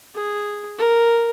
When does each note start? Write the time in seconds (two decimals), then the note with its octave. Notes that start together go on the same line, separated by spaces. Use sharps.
0.15 G#4
0.78 A#4